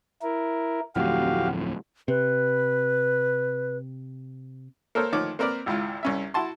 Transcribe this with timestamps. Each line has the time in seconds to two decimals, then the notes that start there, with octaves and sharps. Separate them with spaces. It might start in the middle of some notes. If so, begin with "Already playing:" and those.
0.23 E4 A#4
0.96 D1 F2 A2 F#4 G4 F5
2.08 C3 B4
4.95 A#3 A4 A#4 C5 C#5
5.12 D2 D#3 F3 C#5 D6
5.39 A#3 C4 A#4 B4 D5
5.66 G#1 C#2 E4 F4
6.03 C2 C#4 E5
6.34 E4 F#4 A5 C6